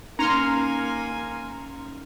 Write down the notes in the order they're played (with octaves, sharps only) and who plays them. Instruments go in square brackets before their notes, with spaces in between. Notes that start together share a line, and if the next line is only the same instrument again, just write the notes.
[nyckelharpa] A#3 G#5 [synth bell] C#4 D#4 C#7 [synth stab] A#5 C6 F6